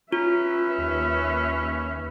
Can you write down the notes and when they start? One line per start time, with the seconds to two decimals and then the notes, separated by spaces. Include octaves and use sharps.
0.12 C#4 F4 B4 E5
0.78 D#2